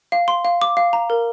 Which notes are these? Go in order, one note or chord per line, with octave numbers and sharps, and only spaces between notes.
F5
C6
F5
D6
F5
A#5
A#4